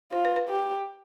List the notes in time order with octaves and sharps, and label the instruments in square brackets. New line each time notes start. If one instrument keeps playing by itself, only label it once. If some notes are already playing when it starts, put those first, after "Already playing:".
[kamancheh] F4 [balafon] C5
[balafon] B4
B4
[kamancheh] G4